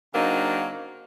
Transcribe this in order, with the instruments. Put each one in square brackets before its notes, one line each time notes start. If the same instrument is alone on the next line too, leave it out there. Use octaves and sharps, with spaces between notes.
[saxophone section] C#3 F#3 A#3 C4 D4 D#4